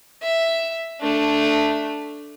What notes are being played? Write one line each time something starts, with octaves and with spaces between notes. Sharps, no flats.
E5
A3 D4